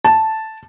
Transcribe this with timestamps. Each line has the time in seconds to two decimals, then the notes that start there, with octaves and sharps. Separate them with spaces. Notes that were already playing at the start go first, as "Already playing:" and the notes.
0.05 A5